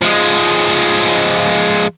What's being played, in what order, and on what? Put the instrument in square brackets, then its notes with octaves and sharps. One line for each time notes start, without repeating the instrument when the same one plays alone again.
[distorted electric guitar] F3 G#3